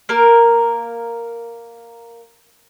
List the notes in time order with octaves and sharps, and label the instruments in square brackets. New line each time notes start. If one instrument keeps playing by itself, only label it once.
[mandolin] A#3 A#4